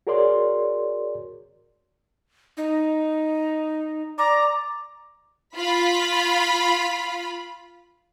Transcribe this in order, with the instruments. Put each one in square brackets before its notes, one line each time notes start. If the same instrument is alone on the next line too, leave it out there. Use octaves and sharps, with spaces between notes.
[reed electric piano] F#4 G#4 A#4 C#5 D5 C6
[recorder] D#4
[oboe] D5 [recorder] A#5
[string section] F4 B5